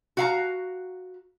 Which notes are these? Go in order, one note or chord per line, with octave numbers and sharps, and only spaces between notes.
F#4 F5 A#5